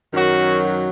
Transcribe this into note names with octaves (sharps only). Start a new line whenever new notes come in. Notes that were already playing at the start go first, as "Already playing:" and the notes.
F#2 D#3 F#3 F#4